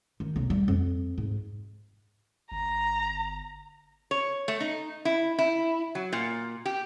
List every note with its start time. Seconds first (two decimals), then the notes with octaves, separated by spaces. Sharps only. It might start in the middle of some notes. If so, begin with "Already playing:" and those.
0.20 D#3
0.36 B1
0.50 G3
0.68 F2
1.18 G#2
2.52 G1 A#5
4.11 C#5
4.48 A3
4.60 D#4
5.05 E4
5.39 E4
5.95 F#3
6.13 A#2
6.65 G4